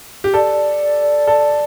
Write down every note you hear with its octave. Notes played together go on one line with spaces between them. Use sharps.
G4
A4 D5
A4